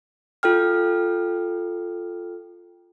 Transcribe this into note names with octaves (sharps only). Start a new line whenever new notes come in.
F4 A4 G5 F6